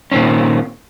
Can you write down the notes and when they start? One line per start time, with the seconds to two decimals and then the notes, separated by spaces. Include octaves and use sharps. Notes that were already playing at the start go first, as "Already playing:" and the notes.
0.12 A#2 D#3 E3 C4 C#4